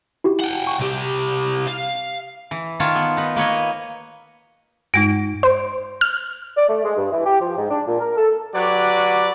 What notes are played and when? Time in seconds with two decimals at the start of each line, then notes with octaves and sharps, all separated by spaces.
0.24 E4 F#4 G4
0.40 F#5 G5
0.67 C#6
0.80 C2 G4
1.67 F5
2.51 E3
2.80 D#3 F4 C#5 A5
2.95 B3
3.17 D#4 B4
3.36 A#3 B4 C#5 D#5
4.94 G2 G#3 D#4 D7
5.43 C5
6.01 F6
6.56 D5
6.68 A3
6.84 G#3
6.97 G2
7.11 E3
7.25 G4
7.41 F3
7.57 G#2
7.70 D4
7.87 A#2
7.99 A#4
8.16 A4
8.55 F#3 F#4 G4 B4 D5